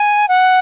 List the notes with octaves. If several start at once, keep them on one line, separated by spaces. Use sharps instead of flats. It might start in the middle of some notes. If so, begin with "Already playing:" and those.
Already playing: G#5
F#5